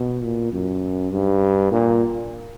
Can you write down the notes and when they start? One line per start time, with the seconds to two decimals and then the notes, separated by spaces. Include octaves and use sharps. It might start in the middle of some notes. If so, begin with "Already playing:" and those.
Already playing: B2
0.24 A#2
0.53 F#2
1.11 G2
1.71 A#2